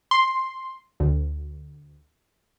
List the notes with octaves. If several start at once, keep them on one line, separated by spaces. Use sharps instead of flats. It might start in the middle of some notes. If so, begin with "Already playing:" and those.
C6
D2